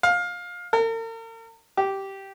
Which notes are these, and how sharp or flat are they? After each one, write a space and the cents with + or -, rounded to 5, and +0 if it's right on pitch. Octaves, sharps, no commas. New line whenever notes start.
F5 +20
A#4 -45
G4 -10